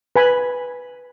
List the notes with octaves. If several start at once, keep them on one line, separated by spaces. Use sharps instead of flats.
B4 G#5 B5